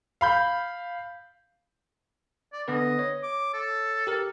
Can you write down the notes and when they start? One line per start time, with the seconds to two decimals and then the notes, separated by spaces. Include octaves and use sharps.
0.21 F5 B5 G6
2.53 D5
2.68 D3 B3 B4 D#5
2.99 C#5
3.23 D6
3.54 A4
4.07 G4 A#4 F6